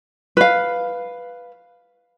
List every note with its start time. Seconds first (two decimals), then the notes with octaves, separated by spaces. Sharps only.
0.37 B4 F5